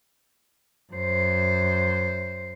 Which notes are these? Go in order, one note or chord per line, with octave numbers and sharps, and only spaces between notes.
F#2 C5